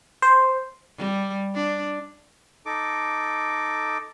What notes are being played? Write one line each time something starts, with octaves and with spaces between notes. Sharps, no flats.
C5
G3
D4
D#4 A4 D6